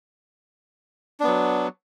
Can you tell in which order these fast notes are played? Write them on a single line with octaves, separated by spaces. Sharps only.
D4 B3 F#3